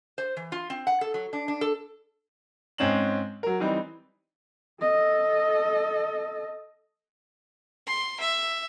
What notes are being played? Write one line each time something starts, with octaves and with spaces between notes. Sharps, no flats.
C5
E3
F4
C4
F#5
A4
F#3
D4
D4
A4
G#2 G#3 C4 C#4 E7 F#7
F#3 A#4
E3 G3 C4 D#4
A4 D#5
C6
E5